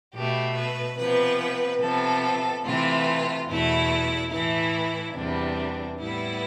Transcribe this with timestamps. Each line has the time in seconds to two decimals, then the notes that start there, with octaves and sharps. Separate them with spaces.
0.14 B2 A3 G4
0.57 B4
0.98 C3 F3 B3 B4
1.81 C3 F3 B3 A4
2.65 C3 E3 A3 F4
3.49 E2 B2 A3 E4
4.32 A2 E3 A3 E4
5.16 E2 C3 G3 B3 D4
5.99 A2 G3 B3 E4